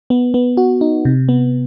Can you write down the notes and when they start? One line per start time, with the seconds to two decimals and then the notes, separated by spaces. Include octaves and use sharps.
0.10 B3
0.34 B3
0.57 F#4
0.81 D#4
1.05 C3
1.29 B3